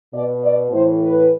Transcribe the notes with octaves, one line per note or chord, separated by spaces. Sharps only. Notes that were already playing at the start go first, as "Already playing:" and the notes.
B2 D5
D5
A2 E3 C5
B4